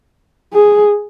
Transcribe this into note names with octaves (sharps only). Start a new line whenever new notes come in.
G#4